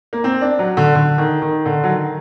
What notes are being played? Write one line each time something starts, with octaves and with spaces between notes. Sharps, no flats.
A#3
C4
D4
F#3
D3
D3
D#3
D#3
D3
F#3
D#3